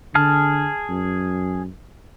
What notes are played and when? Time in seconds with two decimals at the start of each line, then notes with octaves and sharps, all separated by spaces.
0.15 D3 G#4 A5 F6
0.89 F#2